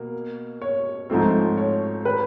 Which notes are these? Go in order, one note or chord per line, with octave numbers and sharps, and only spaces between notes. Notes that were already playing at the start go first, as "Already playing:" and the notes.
Already playing: B2 A#3
C#5
G#2 F3 A3 C4
C#5
B4